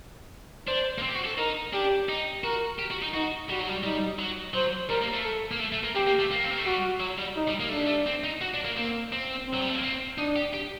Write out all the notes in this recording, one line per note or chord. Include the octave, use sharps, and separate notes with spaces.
D4 C5
A#3
C4
G4
F#4
A4
D#4 A#4
D4 G4
D#4
F#4 A#4
G4
F#4
D#4
D#4 F#4
G3 F#4
F#3
G3
G3 D#4
F#3
F#3 C5
G3 A#4
A#3
A3
A4
A#3
A3
A3
A#3
C4 G4
A#3
A3
A#3
C4
A#3
A3
G3 F#4
F#3
G3
D#4
G3
A#3
A3 D4
G3
A3
C4
D#4
F#4
D4
A#3
A#3 C4
C4
C4
F#3
G3
A3
A#3
C4
D4 D#4
G4
G4